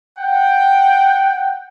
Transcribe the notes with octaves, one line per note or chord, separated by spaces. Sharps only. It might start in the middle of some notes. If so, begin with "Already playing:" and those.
F#5 G5